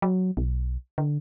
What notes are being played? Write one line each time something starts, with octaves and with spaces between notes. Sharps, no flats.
F#3
B1
D3